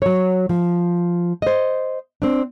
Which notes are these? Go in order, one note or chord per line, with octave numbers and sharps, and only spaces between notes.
F#3 C#5
F3
C5 D#5
C4 D4